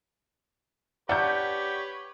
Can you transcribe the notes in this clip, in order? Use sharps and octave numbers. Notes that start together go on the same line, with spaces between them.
D4 G4 B4 C#5 D5 F#5 G6